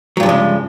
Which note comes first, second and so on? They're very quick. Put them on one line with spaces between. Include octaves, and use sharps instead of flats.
F#3 G2 F3 C#3 G#3